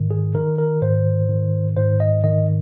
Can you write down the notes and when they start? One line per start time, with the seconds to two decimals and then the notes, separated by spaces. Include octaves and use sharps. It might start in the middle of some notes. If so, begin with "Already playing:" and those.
Already playing: G#2 D#3
0.11 G#4
0.34 D#3 A#4
0.58 A#4
0.82 G#2 C5
1.29 D#3
1.76 G#2 C5
2.00 D#5
2.24 D#3 D#5